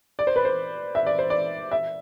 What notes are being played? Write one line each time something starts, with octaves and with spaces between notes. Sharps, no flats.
D5
C5
B4
C5
E5
D5
C5
D5
E5